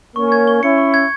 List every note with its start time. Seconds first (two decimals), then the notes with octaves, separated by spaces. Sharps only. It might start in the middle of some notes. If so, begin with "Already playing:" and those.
0.16 A#3 C#4 C#6
0.32 G#6
0.47 G7
0.62 C#4 E4 C#7
0.78 C#6
0.94 G#6